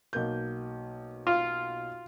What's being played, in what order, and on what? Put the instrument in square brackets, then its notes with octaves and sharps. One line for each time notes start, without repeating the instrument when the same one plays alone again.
[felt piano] B1 A#3 G6
[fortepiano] F4